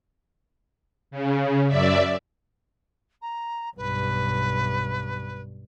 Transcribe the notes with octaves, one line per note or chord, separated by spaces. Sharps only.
C#3
F#2 D5 E5
A#5
B1 G2 B4